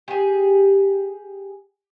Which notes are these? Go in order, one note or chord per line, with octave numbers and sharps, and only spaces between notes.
G4 G#4